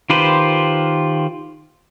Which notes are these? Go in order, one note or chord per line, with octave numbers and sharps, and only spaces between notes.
D#3 F4 G4 B4 C5